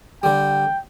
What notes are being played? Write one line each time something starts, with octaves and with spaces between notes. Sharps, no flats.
D3 G3 G5